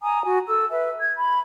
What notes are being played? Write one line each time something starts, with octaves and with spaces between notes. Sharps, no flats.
G#5 A#5 D#6
F#4 G#5
A4 E6
B4 E5
G#6
B5